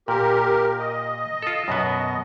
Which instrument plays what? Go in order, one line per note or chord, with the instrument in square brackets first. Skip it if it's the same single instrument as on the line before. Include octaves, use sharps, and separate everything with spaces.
[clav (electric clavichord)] A#2 [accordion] G4 A#4
[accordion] D#5
[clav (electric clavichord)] F4 A4
F#2 B2 B3